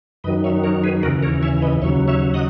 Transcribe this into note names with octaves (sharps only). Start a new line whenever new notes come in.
F#2 D#3 F#3 B4 D#5
C#5 E5
A#4 C#5
G#4 B4
D#2 C#3 E3 F#4 A#4
A#4 C#5
C#5 E5
B4 D#5
D#2 C#3 F#3 C#5 E5
C#5 E5
D#5 F#5